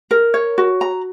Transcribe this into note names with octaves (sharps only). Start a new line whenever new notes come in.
A#4
C#5
F#4
A#5